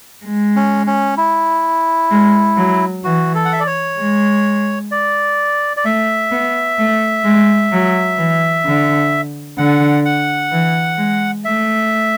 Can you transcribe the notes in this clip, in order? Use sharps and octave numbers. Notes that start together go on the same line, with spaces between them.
G#3
C#4
C#4
E4
G#3
F#3
E3 F#4
A4
F#5
E5
D5
C#5
G#3
D5
D5
A3 E5
B3
A3
G#3
F#3
E3
D3
D3 F#5
F#5
E3
G#3
A3 E5